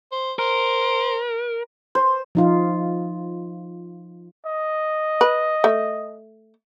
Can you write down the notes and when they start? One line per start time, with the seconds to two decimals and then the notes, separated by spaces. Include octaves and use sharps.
0.12 C5
0.39 A#4 C5
1.95 C5
2.35 F3 D#4 F4
4.46 D#5
5.21 B4
5.64 A3